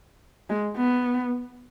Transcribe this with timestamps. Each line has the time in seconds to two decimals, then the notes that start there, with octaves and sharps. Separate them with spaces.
0.50 G#3
0.77 B3